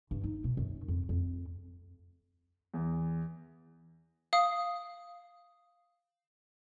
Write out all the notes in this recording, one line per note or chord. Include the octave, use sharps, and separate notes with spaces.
G2
D#4
B2
F#2
F2
F2
E2
F5 D#6